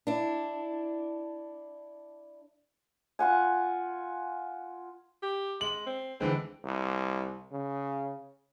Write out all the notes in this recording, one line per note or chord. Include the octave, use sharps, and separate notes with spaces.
D4 E4
F4 F#5 G#5
G4
G#3 F#7
C4
D3 E3 G#3 C4
C2
C#3